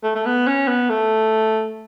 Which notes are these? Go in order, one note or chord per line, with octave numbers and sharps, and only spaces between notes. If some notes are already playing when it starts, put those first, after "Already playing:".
A3
A3
B3
C#4
B3
A3